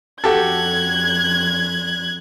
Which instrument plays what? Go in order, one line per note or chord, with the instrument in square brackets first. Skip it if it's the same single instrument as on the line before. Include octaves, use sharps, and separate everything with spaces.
[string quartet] F2 F#6 G#6 [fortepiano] F#4 G4 A4